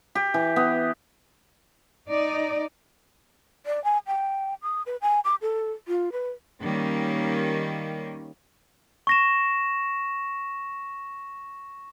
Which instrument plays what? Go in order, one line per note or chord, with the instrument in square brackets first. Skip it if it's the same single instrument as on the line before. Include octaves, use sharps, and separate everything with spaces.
[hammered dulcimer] G4
E3
B3
[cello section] D#4 D5
[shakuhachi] D5
G#5
G5
D#6
B4
G#5
D6
A4
F4
B4
[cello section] D#3 G3 A#3 C#4
[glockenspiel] C#6 A#6 E7